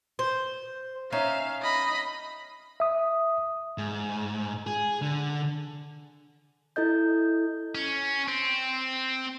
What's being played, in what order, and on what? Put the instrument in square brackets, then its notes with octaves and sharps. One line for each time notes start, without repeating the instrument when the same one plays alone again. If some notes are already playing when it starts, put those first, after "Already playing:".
[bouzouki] C5
[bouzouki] C#4 D#4 E5 [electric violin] F5
[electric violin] D#5 B5
[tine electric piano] E5 D#6
[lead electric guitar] G#2
G#4
D3
[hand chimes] E4 A4 D#5 G6
[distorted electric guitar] C#4
C4